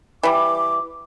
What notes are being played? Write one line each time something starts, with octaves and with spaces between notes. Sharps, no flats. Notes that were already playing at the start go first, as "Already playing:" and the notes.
E3 G3 D6